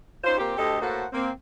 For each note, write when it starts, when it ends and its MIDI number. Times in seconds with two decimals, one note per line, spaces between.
0.24 0.36 61
0.24 0.36 63
0.24 0.36 65
0.24 0.36 72
0.38 0.56 46
0.38 0.56 58
0.38 0.56 60
0.38 0.56 67
0.57 0.81 38
0.57 0.81 67
0.57 0.81 69
0.57 0.81 75
0.81 1.05 45
0.81 1.05 58
0.81 1.05 66
0.81 1.05 69
0.81 1.05 72
0.81 1.05 78
1.13 1.29 58
1.13 1.29 60